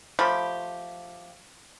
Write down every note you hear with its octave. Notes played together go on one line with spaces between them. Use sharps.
F3 A3 G4 B5